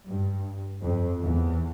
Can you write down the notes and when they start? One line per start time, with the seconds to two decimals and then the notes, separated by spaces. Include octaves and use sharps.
0.10 G2
0.81 F2
1.21 E2